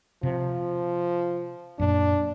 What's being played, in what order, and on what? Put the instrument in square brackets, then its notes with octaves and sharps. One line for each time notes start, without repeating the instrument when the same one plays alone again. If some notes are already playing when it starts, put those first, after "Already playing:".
[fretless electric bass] C3 [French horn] F3
[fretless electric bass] F#2 A#2 [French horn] D4